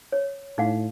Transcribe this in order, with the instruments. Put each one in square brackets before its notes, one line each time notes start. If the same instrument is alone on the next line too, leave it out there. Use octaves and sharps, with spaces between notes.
[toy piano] C#5
[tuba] A2 [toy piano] D#4 F5 F#5